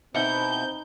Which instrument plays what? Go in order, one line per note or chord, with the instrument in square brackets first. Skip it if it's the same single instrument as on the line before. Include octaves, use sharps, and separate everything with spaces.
[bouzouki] B2 E4 [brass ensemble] C4 [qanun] D#4 F#5 [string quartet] G6